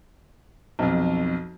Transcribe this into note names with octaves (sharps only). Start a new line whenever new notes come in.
B1 F2